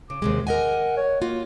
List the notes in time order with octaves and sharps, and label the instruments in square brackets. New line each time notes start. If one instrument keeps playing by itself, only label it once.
[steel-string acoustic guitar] C#3 [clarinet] D6
[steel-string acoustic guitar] D#2 C3 G#3
[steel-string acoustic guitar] A#4 D#5 G#5 [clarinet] F#5
[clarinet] C#5
[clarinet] A#3 [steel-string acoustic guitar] F4 F#4